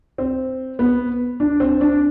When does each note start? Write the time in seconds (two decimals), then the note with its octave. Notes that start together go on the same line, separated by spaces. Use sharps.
0.18 C4
0.79 B3
1.40 D4
1.60 C4
1.81 D4